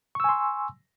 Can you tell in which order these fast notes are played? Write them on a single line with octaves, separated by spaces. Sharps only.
C#6 E6 G#5 C6